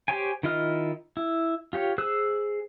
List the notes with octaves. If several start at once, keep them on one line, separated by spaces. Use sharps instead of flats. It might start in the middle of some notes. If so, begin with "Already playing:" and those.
G4 C5 C#5 G5 G#5
D#3 E4 F4 D#5 F6
E4
F4 G4 C#5
G#4 C5 E6 F#6